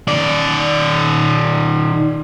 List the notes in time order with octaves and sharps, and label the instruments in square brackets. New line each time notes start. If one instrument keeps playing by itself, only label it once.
[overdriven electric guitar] D#3 D5